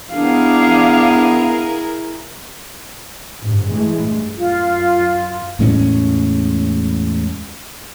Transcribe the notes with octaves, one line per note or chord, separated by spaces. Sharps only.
B3 D4 E4 G#4 A#4 F5
G1 G#2 C3
E3 G#3 A3
G2
F#2 F4
E2 A2 G#3 C#4